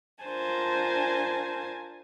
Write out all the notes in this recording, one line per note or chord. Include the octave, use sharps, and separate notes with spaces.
D4 F4 A#4 C5 G#5 A5